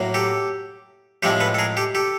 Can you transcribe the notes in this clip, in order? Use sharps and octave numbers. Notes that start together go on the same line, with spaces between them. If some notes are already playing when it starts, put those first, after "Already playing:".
Already playing: A2 F#3 A#3
G4 A4
A2 F3 G#3 C4 G4 A4
A4 B4
A4
G#4 A#4
G4 A4
G4 A4